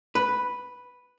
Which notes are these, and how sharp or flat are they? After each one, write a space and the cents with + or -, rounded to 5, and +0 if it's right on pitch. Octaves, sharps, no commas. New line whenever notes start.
B4 +0